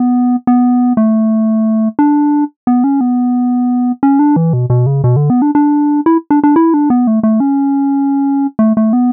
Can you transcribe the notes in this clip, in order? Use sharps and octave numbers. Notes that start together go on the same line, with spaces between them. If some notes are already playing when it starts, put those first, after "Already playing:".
Already playing: B3
B3
A3
D4
B3
C#4
B3
C#4
D4
E3
B2
B2
C#3
B2
D3
B3
D4
D4
E4
D4
D4
E4
D4
B3
A3
A3
C#4
A3
A3
B3